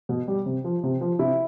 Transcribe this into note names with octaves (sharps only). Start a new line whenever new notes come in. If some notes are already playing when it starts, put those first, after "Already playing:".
B2
G3
C3
F3
C3
F3
C3 E4